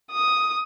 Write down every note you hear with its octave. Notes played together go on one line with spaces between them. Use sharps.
D#6